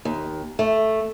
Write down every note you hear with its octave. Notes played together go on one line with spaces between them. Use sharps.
D#2
A3